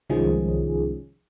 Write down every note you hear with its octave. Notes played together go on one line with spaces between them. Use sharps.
C2 D#3 F3 G#3 C#4 G#4